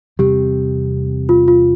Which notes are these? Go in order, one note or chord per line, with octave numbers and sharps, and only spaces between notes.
E2 C3 G3 C4 G4
F4
F4